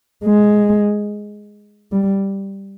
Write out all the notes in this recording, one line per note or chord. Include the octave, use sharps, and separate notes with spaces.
G#3
G3